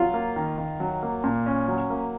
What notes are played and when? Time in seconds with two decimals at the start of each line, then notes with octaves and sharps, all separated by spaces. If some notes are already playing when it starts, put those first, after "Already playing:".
Already playing: F#3 F4
0.14 A#3
0.36 D#3
0.58 D#3
0.80 F#3
1.03 A#3
1.24 A#2
1.46 C#4
1.68 F#3
1.90 A#3